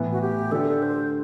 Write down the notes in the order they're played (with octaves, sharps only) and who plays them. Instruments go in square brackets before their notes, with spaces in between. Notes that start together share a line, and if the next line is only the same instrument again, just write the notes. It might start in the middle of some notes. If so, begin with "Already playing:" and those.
Already playing: [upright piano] A2 E3 B3
[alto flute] F#4
G4
[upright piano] D3 A3 D4 G4 [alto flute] A4
[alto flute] C5